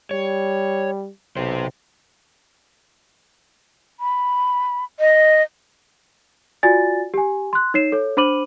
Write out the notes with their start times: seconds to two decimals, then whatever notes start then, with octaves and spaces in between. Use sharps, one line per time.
0.11 G3 C#5
1.37 B1 C3 C5
4.00 B5
4.99 D#5
6.63 F4 F#4 D5 G#5 A6
7.14 G4 G#5
7.53 C6 F#6
7.74 D#4 C#5 C7 E7
7.92 A4 C#5
8.17 D4 C5 B5 D6 D#7 F#7